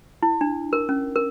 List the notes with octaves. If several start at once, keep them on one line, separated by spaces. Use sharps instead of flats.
E4
D4
A#4
C#4
A#4